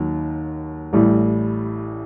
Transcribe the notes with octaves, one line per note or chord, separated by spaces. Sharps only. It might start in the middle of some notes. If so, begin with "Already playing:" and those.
Already playing: D#2 D#3 F#3
A1 A2 G3